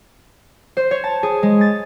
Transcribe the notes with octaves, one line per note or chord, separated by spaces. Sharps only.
C5
C#5
A5
G#4
G#3
A6